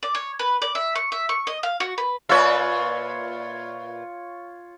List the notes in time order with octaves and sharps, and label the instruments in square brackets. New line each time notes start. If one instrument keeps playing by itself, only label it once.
[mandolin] D5
C#5
B4
D5
E5
C#6
E5
C#6
D#5
F5
F#4
B4
[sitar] A#2 B4 E5 [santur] F4 C#5